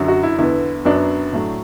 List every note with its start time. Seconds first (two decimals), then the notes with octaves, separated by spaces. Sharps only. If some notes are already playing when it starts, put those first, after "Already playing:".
Already playing: F#2 D3 F#3
0.08 F#4
0.23 E4
0.38 E2 D3 B3 E4
0.85 F#2 F#3 B3 D4
1.33 A2 F#3 A3